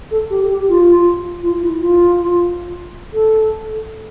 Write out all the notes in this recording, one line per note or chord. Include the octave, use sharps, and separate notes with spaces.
A4
G4
G4
F4
F4
E4
F4
A4